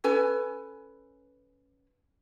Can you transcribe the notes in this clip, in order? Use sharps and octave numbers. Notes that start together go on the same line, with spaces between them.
C#4 A4 B4 G#5